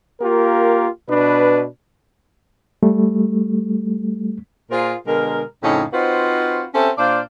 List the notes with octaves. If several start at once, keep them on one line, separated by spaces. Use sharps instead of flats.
A#3 F4 G4 A#4
B2 D4 B4
G3 A3
A#2 F4 G#4 A#4 C5 F5
B2 D3 G#3 A#4
F2 A2 C#3 C#4 D#4
C4 D#4 F4 F#4 B4 C5
C4 C#4 G4 A4 C5 E5
A#2 D4 C5 D5 F5